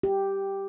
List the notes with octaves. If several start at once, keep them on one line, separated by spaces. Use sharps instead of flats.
G4